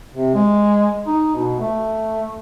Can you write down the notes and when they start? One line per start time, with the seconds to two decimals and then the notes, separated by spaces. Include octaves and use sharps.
0.15 C3
0.34 G#3
1.07 D#4
1.35 B2
1.59 A3